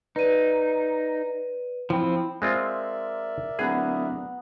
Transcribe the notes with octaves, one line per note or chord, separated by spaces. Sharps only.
D#4 B4 D5 D#7
F3 C4 E4 G5 B5
G#3 C4 F4 A#4 D5 E5
D1 B3 G#4 F#5 A#5